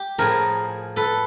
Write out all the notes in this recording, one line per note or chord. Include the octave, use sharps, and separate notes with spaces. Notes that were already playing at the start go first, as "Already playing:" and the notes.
Already playing: G4
A2 F3 G#4 A#4
A4 B4